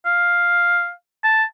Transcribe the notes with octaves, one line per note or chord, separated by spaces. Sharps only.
F5
A5